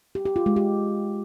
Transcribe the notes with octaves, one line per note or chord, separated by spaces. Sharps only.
G4
G4
F4
G#3
G4